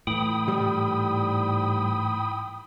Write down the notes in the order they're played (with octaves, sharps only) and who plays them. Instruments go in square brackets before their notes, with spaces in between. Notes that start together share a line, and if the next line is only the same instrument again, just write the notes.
[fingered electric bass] A2 E3 [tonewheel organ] G5 B5 D#6
[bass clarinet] G#2 [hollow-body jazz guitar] G3 G4